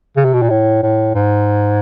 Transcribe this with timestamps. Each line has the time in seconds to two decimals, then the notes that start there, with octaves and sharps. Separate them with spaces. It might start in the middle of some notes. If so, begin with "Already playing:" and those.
0.17 C#3
0.25 C3
0.34 B2
0.42 A#2
0.50 A2
0.83 A2
1.15 G#2